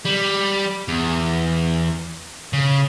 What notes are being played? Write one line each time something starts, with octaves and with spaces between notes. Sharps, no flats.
G3
E2
C#3